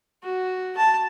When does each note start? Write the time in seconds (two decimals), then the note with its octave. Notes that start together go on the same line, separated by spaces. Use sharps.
0.23 F#4
0.77 A5